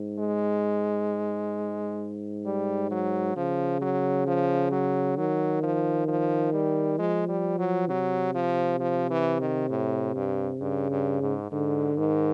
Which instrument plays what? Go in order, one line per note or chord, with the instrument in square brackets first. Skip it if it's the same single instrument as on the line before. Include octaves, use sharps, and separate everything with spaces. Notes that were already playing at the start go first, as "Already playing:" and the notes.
Already playing: [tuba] G#2
[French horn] G#3
G3
F#3
[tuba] C#3 [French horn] F3
[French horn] F#3
F3
F#3
[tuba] D#3 [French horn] F#3
[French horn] F3
F3
G3
[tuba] F3 [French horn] G#3
[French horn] G3
F#3
[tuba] C3 [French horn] F#3
[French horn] F3
F3
E3
D#3
A2
G2
[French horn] G2 [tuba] C#3
[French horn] G2
G#2
[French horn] G#2 [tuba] D3
[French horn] G#2 [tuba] D#3